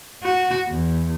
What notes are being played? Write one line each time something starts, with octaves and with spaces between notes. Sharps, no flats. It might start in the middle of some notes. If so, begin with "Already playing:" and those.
F#4
E2